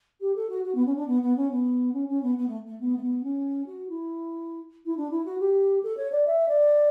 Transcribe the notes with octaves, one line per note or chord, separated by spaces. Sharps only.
G4
A4
F#4
F#4
B3
C#4
D4
B3
B3
C#4
B3
C#4
C#4
B3
B3
A3
A3
B3
A3
B3
C#4
F#4
E4
E4
D4
E4
F#4
G4
A4
C#5
D5
E5
D5